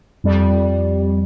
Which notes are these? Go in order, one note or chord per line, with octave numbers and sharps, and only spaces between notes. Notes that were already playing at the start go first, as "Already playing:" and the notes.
F2 G3